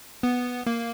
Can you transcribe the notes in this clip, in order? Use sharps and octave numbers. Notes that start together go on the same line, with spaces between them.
B3
A#3